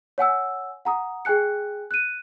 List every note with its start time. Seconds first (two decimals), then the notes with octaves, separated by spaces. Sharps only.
0.18 C#5 F#5 G#5 E6
0.85 F#5 A#5 D#6
1.25 G#4 G5 G#5 F#6 C#7
1.91 F#6 D#7